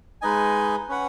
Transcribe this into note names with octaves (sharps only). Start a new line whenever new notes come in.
G#3 D#4 B4 D#5 G#5
C#4 B4 F#5